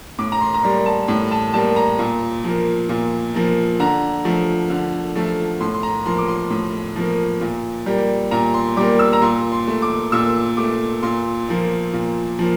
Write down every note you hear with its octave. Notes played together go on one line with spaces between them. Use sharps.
A2 D6
A#5
C6
A#5
G3 A#3 C6
A5
A2
A5
G3 A#3 A5
A#5
A#2
F3 A#3
A#2
F3 A#3
D3 A#5
F3 A3
D3
F3 A3
A2 C6
C6
A#5
F3 A#3 C6
D6
C6
A2
F3 A#3
A#2
G3 A#3
A#2 A#5
C6
G3 A#3 D6
E6
A#5
A#2 C6
C6
A3
D6
A#2 E6
A3 D6
A#2 C6
F3 A#3
A#2
F3 A#3